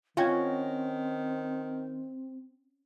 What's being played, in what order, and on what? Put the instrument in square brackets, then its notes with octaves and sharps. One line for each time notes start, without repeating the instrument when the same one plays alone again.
[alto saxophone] D#3 [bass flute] C4 [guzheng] C#4 F#4 [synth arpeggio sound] F4 G5 G#6